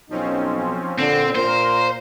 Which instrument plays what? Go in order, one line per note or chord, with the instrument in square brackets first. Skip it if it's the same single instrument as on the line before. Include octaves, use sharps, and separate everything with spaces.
[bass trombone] B1 [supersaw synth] F3 C4 C#4 [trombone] D#4
[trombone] A#2 [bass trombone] D3 [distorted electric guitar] C4
[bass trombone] A#2 [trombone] A#3 [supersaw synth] A#4 [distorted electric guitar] C5